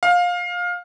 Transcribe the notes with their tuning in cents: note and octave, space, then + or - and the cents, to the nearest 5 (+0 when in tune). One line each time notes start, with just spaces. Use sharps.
F5 +20